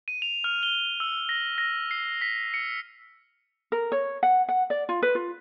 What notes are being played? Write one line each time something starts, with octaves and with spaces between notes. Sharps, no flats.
D#7
F7
F6
G7
E6
A#6
A#6
C7
B6
C#7
A#4
C#5
F#5
F#5
D5
F4
B4
F4